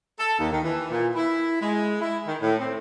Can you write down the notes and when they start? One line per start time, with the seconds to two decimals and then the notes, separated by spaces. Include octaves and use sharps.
0.20 A4
0.39 D#2
0.52 D#3
0.64 E3
0.91 A#2
1.15 E4
1.62 G#3
2.01 E4
2.27 D#3
2.42 A2
2.59 C4